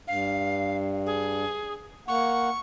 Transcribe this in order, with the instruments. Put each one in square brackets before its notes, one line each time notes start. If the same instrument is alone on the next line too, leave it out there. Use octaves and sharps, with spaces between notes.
[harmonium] G2 [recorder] F5
[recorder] G#4
[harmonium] A#3 F#5 [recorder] C#6